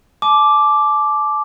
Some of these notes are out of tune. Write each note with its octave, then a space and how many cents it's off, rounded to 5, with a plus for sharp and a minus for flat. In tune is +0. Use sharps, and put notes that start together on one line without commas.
A5 -40 D6 +0